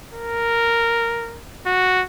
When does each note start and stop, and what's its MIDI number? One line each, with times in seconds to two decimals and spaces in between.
0.13 1.43 70
1.66 2.03 66